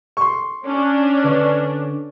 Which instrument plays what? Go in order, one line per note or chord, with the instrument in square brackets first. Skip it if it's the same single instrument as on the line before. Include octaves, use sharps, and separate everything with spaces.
[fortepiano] C6 C#6
[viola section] C#4 D4
[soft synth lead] D3 [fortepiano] B4 D5